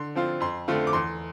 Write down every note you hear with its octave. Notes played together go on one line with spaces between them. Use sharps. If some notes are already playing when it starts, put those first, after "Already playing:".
Already playing: D3 C6
F3 C4 F4
F2 C6
D3 A3 C4 F4
D6
E2 C6